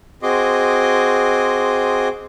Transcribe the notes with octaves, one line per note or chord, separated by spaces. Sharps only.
C4 F#4 G#4 D#5 C6 D6